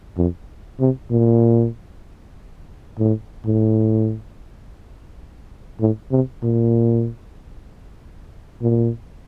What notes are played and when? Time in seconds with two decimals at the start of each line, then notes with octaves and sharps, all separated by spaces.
0.17 F2
0.80 C3
1.11 A#2
2.99 A2
3.45 A2
5.80 A2
6.11 C3
6.43 A#2
8.62 A#2